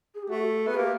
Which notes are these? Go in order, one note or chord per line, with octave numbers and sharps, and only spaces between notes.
G#4
G4
A3 F#4
B3
G#4
A#3 G4